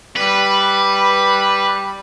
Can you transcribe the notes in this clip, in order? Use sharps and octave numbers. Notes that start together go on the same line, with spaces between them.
G3 B4